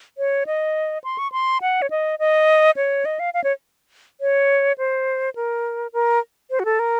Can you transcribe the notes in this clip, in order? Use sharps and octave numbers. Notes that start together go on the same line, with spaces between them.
C#5
D#5
C6
C#6
C6
F#5
C#5
D#5
D#5
C#5
D#5
F5
F5
C#5
C#5
C5
A#4
A#4
C5
F#4
A4
A#4